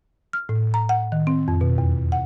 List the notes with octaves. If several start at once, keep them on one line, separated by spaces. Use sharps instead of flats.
F6
A2
A#5
F#5
D#3
C4
F2
B2
E2
F#5